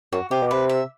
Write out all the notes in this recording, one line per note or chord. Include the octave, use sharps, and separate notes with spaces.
F#2 F#4
C3 G4
B2
C3 B4
E5